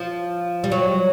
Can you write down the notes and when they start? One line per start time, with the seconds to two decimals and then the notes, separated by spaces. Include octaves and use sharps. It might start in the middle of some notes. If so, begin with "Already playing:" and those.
Already playing: F3
0.64 G3
0.72 F#3